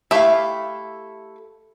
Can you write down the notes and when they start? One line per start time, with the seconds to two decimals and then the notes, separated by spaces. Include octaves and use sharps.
0.11 A3 E4 G4 E5 F5